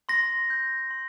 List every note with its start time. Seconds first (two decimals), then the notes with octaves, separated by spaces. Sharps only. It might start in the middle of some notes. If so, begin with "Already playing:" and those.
0.09 C6 A#6
0.50 G6
0.90 C6